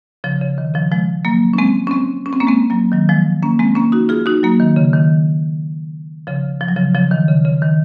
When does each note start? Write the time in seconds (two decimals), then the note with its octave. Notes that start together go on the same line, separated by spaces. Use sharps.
0.24 C#3 F3
0.42 C#3
0.58 D#3
0.74 C#3 F3
0.91 F3 G#3
1.25 F#3 A#3
1.54 C#4
1.58 G#3 C4
1.87 C#4
1.91 G#3 C4
2.26 C#4
2.33 C4
2.40 A#3 C#4
2.47 G#3 C4
2.70 F#3 A#3
2.92 D#3 F#3
3.09 F3 G#3
3.43 A#3 C#4
3.59 G#3 C4
3.75 A#3 C#4
3.92 D#4 F#4
4.09 F4 G#4
4.26 D#4 F#4
4.43 F#3 A#3
4.60 D#3
4.76 C#3
4.93 D#3
6.27 C#3 F3
6.61 F3
6.68 F#3
6.76 C#3 F3
6.95 C#3 F3
7.11 D#3
7.29 C#3
7.45 C#3
7.62 D#3